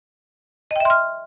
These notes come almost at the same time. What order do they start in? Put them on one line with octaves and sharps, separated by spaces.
D#5 G5 E5 C6 F6